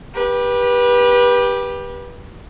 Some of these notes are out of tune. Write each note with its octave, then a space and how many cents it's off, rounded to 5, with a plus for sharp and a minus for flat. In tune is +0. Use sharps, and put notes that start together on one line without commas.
G4 +10 B4 -25